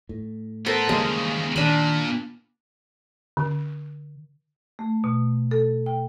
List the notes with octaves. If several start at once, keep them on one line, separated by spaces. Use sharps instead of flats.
A2
B3 A4 A#4 C5
D#2 C#3 E3 G3 G#3 A#3
A#2 D#3 D4 B5
D3
A3
B2
A4
G5